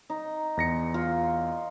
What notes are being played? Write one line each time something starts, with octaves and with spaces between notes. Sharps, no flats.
D#4
E2 A#6 C#7
F4